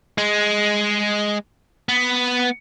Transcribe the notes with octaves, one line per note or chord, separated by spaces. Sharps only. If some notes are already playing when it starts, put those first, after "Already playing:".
G#3
B3